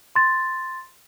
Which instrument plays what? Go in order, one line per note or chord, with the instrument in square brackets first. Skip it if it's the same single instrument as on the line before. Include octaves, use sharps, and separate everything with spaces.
[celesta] C6 A6